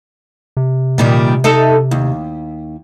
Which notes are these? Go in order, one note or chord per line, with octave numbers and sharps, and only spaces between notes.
C3
A#2 D#3 G3
D#4 A4 E5
D#2